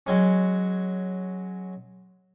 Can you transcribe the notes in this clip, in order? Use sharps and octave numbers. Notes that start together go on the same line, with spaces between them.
F#3 G#3 C#4